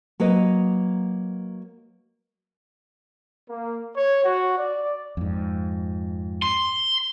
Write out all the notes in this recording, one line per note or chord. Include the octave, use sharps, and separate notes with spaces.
F#3 A#3 B4 D#5
A#3
C#5
F#4
D5
F2 G#2
C6